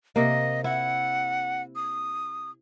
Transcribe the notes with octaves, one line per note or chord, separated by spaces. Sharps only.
C3 A#3 D#5
E4 F#5
D#6